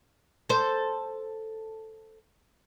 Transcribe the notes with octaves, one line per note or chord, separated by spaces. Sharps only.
A4 C5